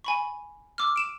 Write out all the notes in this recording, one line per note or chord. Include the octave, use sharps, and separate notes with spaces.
G#5 B5 C#6
D6 E6 F6
D7 E7